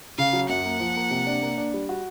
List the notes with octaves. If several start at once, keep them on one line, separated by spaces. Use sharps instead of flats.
C#3 F5
F#3
F#2 F#5
A#3
F3
A#3
C3
D4
A#3
D4
G3
F#4